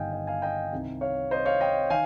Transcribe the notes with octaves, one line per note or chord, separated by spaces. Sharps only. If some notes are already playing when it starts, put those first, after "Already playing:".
Already playing: G1 G2 D#3 D#5 F5 G5 G#5
D#5 G5
F5 G#5
D#5 G5
C2 C3 D#3
C#5 F5
C5 D#5
C#5 F5
D#5 G5
D#3 F5 G#5